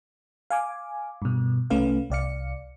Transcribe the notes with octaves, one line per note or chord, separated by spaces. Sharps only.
F5 G#5 D6
G2 B2
C2 A3 C#4 B4 F5
C2 D5 F5 C#7